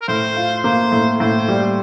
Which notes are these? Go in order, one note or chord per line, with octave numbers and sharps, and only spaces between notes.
A#4
A2 C5
F4
A#3 C5
A2
A2 C5
G3